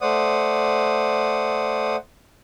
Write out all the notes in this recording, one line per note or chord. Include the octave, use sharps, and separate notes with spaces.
A3 C5 D5 F#5 D#6